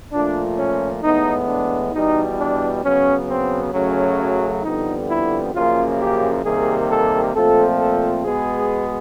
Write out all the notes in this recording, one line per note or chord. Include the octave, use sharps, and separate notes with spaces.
A#2 F3 A3 D4
C#4
A2 E3 G#3 B3 D#4
D4
E2 B2 G3 D#4
D4
C#3 F#3 B3 C#4
C4
F#2 C#3 F#3 A3 C#4
F2 D3 G3 B3 D#4
E4
F#2 C#3 F3 A#3 F4
G4
C3 D#3 G3 A#3 G#4
A4
A#2 F3 A3 C4 A4
A4
B2 G#3 B3 G#4